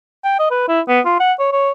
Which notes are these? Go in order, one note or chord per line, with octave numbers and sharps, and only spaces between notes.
G5
D#5
B4
E4
B3
F4
F#5
C#5
C#5